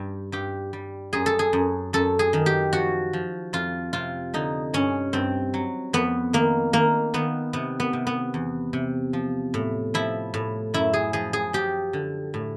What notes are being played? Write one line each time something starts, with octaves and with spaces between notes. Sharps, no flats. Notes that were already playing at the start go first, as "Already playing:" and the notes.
Already playing: G2 G3 G4
G2 G4
G3
F#2 G#4
A4
G#4
F#2
F#2 A4
G#4
D#3
G4
F3 F#4
F3
F2 F4
C3 F4
D3 D#4
G2 C#4
G2 C4
F#3
F2 B3
D#3 A#3
D#3 A#3
D#3 B3
C3 B3
B3
C3
B3
E2
C3
F3
A2
F3 E4
A2
F#2 E4
G#4
F3 G#4
G#4
F3 G4
D3
A2